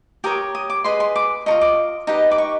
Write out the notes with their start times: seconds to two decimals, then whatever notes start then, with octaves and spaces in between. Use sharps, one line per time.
0.24 G4 A#4 C#5 D#6
0.55 D#6
0.70 D6
0.84 G#4 B4 D#5 C6
1.00 C6
1.16 D6
1.46 F4 A#4 D#5 C#6
1.61 D6
2.07 D#4 G4 B4 D#5
2.31 D6
2.38 C#6